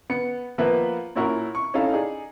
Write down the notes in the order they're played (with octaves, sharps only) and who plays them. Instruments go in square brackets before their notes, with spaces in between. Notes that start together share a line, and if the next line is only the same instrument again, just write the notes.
[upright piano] B3 C#7
F3 A#3 B3 B4 E5
A#2 C#4 E4 F#4 A#4
C#6
C#4 D#4 E4 A4 F5
D#4 G#4 D5